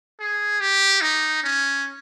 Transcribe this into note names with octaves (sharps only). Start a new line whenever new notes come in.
G#4
G4
D#4
C#4